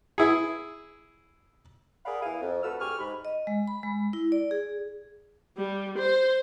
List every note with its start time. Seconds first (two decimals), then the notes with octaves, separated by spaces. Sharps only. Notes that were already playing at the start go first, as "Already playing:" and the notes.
0.18 E4 G#4
2.06 G#4 A#4 D5 F5 F#5 B5
2.22 E2 E4 G#4 F5
2.41 F2
2.63 D2 F#4 A4 B4 E6 F6
2.80 D2 G4 G#4 C#6 F6
2.99 G#2 B5
3.25 D#5
3.47 G#3
3.68 B5
3.83 G#3
4.13 E4
4.32 D5
4.51 G#4
5.58 G3
5.98 C5